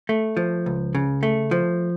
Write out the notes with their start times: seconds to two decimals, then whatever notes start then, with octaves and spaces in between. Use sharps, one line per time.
0.09 A3
0.37 F3
0.66 C#2
0.95 C#3
1.23 A3
1.51 F3